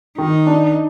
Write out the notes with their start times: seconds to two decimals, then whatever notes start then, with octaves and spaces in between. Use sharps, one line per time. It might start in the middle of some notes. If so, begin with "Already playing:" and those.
0.18 D#3 D#4
0.47 D4